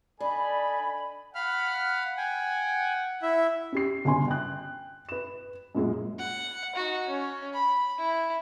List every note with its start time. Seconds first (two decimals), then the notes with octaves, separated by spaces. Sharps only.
0.20 D4 A4 D5 D#5 G#5 B5
1.35 F5 F#5 B5 F6
2.17 G5 G#5
3.22 E4 E5
3.72 C#4 G4 C7
4.05 G1 C#3 G#5 C6
4.28 G5 F#6
5.09 B4 E7
5.75 F#2 A#2 G#3
6.18 F#5
6.75 D#4 F#4
7.07 C#4
7.53 B5
7.98 E4